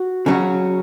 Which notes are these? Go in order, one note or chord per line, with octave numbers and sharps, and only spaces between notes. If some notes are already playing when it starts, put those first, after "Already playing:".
Already playing: F#4
C#3 F#3 C#4 F#4